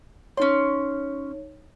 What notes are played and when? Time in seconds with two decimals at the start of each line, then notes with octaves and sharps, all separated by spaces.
0.37 C#4 D#4 C#5 C6